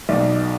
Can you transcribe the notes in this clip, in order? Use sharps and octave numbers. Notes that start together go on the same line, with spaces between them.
B1 B2 D5